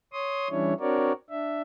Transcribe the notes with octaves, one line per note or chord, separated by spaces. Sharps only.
C#5 C6 D#6
E3 G3 C#4 D4 E4 C#5
C4 D4 F#4 A#4 C#5 D5
D4 E5